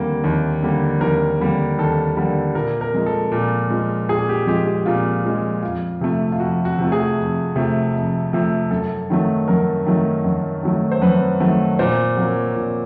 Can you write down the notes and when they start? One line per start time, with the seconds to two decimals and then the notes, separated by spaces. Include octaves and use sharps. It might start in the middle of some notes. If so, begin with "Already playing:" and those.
Already playing: D#2 D3 G3 A#3
0.24 D#2
0.63 D3 G3 A#3
1.01 D#2 A#4
1.40 D3 G3 A#3
1.78 D#2 A4
2.17 D3 G3 A#3
2.55 A#2 A#4
2.81 A#4
2.94 F3 G#3
3.06 A4
3.32 A#2
3.70 F3 G#3
4.09 A#2 G#4
4.29 G4
4.47 F3 G#3 G4
4.67 G4
4.86 A#2 F4
5.24 F3 G#3
5.63 F2 F4
6.01 C3 F3 A3
6.32 F4
6.40 F2 F#4
6.65 F#4
6.79 C3 F3 A3
6.92 G#4
7.17 F2
7.56 C3 F3 A3
7.94 F2
8.33 C3 F3 A3
8.71 F#2 A4
9.10 D#3 F#3 A3
9.48 F#2 A#4
9.86 D#3 F#3 A3
10.25 F#2
10.63 D#3 F#3 A3
10.92 C5
11.02 F#2 B4
11.40 D#3 F#3 A3
11.79 A#2 C5
12.17 F#3 A#3
12.56 A#2